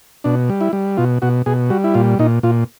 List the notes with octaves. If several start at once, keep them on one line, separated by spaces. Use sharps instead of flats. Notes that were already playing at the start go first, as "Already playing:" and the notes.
B2 D4
G3
E4
G3
B2 F4
B2 F#4
B2 G#4
G3 F#4
E4
A#2 F4
A#2 D#4
A#2 F4